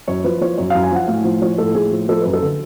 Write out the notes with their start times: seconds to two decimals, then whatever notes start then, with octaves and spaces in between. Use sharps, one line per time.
0.08 F#2 C#5
0.24 F3 B4
0.41 F3 C#5
0.58 F#2 C#5
0.70 F#2 F5
0.83 G#5
0.91 F3 F#5
1.08 A2 F5
1.24 F3
1.42 F3 C#5
1.58 A2 A4
1.75 A2 G#4
1.91 F3
2.09 F3 A4
2.21 F#2 B4
2.33 A4
2.42 D3